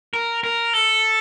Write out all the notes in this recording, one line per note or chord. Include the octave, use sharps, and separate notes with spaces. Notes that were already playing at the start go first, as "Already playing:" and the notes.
A#4
A#4
A4